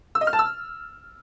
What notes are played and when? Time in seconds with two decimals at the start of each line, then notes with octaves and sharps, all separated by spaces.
0.15 E6
0.21 D#5
0.27 F6
0.33 A5
0.39 E6